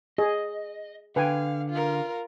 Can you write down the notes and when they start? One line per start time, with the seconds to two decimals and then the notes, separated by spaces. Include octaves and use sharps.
0.18 G#4 D#5
1.16 D3 B4 F5 G5 G#5
1.71 F4 A#4